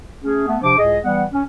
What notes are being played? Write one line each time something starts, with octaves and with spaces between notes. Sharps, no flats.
A3 C#4 G#4
A3 B3
C3 F3 D4 C5 D6
C#2 A2 G#4 D#5
E3 G3 B3 F#5
C#4